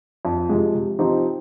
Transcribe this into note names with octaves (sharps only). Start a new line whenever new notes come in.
F2
C3 F3 G#3
C3
F3 C4 D#4 G4